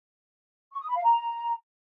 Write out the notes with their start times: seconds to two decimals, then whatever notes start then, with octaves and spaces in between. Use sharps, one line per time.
0.72 C#6
0.80 D#6
0.88 B5
0.95 F5
1.03 A#5